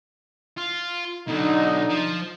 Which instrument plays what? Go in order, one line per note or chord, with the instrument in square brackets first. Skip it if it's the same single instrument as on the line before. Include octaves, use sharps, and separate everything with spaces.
[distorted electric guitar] F4
[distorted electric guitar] B2 F#3 [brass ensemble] D3 D#4
[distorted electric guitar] F3